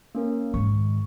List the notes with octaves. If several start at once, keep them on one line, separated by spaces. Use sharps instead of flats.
A#3 C#4 A#4
G#2 D#3 C#6